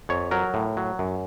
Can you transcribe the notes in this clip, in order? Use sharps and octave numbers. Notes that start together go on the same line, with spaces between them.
F2 C#5
F#3 A#4
A2
F#3
F#2